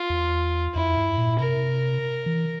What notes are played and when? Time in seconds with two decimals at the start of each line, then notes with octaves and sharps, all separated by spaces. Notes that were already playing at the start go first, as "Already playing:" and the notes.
Already playing: F4
0.10 E2
0.75 F2 E4
0.97 G2
1.18 A#2
1.39 C3 A#4
2.26 E3